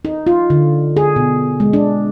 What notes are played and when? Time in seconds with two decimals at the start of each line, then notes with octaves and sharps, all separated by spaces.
0.05 D#4
0.27 F4
0.50 D3
0.97 G#4
1.16 B2
1.60 G#3
1.73 D4